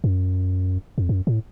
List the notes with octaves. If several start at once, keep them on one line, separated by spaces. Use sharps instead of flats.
F#2
F2
F#2
A2